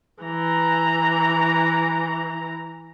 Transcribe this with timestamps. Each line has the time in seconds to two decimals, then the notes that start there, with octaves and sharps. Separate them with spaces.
0.23 E3 A#5